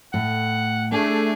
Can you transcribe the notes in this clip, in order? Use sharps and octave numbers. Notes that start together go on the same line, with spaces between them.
A2 F#5
A3 D4 G#4